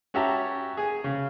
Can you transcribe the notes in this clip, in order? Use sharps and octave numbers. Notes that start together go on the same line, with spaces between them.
C#4 F#4 G4 E5 A5 A#5
G#4 G#5
C#3